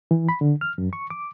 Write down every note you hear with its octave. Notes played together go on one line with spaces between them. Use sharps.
E3
B5
D3
F6
F#2
C#6
D6